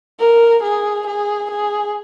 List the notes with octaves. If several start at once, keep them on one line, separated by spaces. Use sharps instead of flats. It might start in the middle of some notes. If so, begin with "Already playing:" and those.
A#4
G#4
G#4
G#4